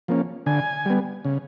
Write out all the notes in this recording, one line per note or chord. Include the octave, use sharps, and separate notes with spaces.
F3 A#3 C#4
D3 G#5
G3 B3
C#3